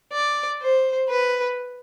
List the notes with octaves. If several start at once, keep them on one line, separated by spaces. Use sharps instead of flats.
D5
C5
B4